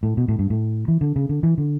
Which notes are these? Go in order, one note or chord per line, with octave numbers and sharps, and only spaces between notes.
A2
B2
A2
G2
A2
E3
D3
C#3
D3
E3
D3